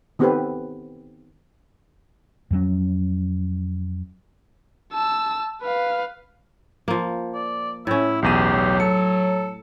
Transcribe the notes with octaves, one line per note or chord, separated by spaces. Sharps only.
D#3 B3 C4 G4 A4 B4
F2 F#3 C#4
A5 E6
B4 F5
F3 A#3
D5
A2 C#4 E4
B1 E2 G4 D#7
F#3
A4 C#7